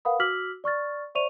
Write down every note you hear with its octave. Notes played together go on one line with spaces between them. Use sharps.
A#4 B4 F5 F#5 B5 D#6
F#4 D6 E6 F6 B6 F#7
D5 C#6 F6 A6
C5 D5 E5 C#6 D#7 F7